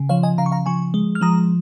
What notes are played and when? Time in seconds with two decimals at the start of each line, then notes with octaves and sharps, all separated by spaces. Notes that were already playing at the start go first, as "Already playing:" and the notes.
Already playing: C#3
0.09 F3 C#5 F5
0.23 D#5 G#5
0.38 C#3 F5 A#5
0.46 C#6
0.52 F5 A#5
0.66 F3 G#5 C#6
0.94 G#3
1.15 F6
1.21 F3 A#5 D#6